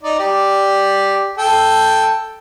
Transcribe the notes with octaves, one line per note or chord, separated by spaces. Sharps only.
D#4 D5
G4 D5
A4 G5